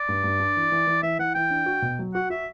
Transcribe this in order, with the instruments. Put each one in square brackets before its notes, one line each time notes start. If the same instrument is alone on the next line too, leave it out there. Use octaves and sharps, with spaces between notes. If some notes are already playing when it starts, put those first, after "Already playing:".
Already playing: [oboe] D5
[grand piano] G2
G2
D4
E3
E3
E3
[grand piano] E3 [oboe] E5
[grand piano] E3 [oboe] F#5
[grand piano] E3 [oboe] G5
[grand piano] D4
F#4
B2
F#3
[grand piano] F#4 [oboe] F#5
[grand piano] F#4 [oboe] E5